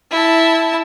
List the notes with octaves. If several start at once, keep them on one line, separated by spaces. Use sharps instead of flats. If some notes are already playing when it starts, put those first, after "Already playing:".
E4 A5